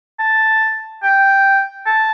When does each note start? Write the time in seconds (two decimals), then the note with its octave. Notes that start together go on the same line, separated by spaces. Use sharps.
0.19 A5
1.03 G5
1.86 A5